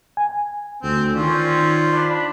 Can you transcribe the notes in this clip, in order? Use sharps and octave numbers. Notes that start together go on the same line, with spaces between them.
G#5
D2 C4
D#3 C4 C#4 F4 C5 D5
D4 B5